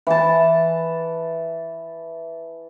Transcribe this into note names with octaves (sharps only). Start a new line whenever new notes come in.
E3 A5